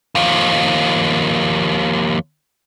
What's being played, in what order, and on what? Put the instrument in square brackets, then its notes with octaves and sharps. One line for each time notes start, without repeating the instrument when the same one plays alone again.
[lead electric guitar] D#2 F3